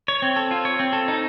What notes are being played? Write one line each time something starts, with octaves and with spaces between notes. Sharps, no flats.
C#5
C4
A4
F4
C#5
C4
A4
D#4